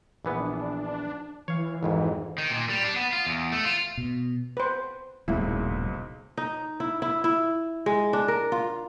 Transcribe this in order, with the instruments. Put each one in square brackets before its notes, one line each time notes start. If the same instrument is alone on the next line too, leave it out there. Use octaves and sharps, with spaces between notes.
[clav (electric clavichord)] A#1 E3 B3
[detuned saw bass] D4
[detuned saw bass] E3 [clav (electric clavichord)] C#5 F5
[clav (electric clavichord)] G#1 F2 G#2
[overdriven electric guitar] D#3
A#2
G3
D4
B3
F4
E2
A3
F4
[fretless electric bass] B2
[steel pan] B4 C5
[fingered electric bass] D#1 G3 A#3 [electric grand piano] B1 G#2 C#3 [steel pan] E4
[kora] D#4
E4
E4
E4
G#3
D4
A#4
F4